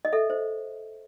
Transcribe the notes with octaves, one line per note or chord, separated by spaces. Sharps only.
D#5
A4 E5
C5